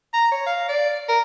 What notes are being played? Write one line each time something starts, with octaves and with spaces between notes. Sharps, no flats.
A#5
C#5
F5
D5
A#4